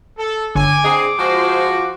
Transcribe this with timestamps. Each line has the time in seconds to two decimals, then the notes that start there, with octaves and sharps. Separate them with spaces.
0.18 A4
0.55 G1 D3 C#5 G#5 D6
0.84 C4 D4 G#4 D#5 F#5 A#5
1.18 F3 G#3 F4 F#4 C5